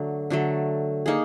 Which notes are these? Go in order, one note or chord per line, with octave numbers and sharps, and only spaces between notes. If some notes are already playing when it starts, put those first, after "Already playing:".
Already playing: D3 F#3 A3
D3 F#3 A3
A#3 D#4 G#4